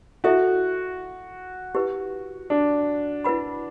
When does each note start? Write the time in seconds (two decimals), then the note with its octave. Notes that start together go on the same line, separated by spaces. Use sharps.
0.24 E4 F#4 A4 E5
1.75 E4 G4 B4
2.50 D4
3.24 E4 B4 F#5 B5